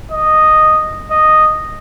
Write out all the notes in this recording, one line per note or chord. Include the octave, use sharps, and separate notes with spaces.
D#5
D#5